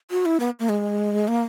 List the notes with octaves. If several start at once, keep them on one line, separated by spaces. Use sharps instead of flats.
F#4
E4
B3
A#3
G#3
A#3